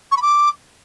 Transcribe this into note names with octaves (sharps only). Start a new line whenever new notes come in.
C#6
B5
D6